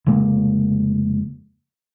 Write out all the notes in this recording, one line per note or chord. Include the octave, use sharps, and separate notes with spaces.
F1 C#3 G#3 A#3